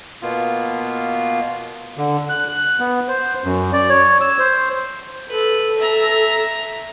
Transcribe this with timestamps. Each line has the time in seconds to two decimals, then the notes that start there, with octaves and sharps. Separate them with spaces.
0.22 B2 A#3 B3 F4
1.97 D3
2.30 F#6
2.48 F#6
2.80 B3
3.08 C5
3.44 F#2
3.73 D5
3.90 C#5
4.21 E6
4.39 C5
5.29 A4 B4
5.78 E5 A#5